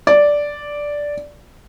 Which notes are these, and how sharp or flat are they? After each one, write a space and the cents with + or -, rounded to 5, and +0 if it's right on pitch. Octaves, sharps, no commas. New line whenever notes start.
D5 -5